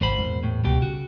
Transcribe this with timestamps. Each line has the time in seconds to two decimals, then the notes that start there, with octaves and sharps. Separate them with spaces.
0.01 G#1 G#2 C3 C5 B5
0.18 E2 A#2
0.43 A2
0.64 C#2 B2 G3 G4
0.82 C#3 F#4